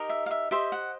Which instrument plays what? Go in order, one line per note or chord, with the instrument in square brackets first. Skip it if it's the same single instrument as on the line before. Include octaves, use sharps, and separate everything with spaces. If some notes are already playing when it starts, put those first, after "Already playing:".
Already playing: [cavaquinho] D#4 G4 A#4 D#5
E5
F5
E5
G4 C5 D#5 E5
F#5